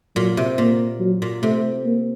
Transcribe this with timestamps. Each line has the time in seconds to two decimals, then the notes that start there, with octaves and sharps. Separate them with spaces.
0.16 A#2 F#3
0.37 C3
0.58 A#2 A#3
1.00 F#3
1.22 A#2
1.42 C3 A3
1.85 A#3